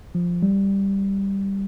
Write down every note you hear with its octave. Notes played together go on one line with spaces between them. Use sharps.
F3
G3